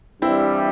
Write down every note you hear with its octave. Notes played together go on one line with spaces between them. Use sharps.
G2 E3 G3 C4 E4